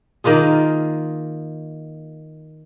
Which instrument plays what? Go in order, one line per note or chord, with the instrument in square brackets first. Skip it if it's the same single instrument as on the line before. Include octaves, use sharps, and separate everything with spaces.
[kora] D#3 A#3 F4 G#4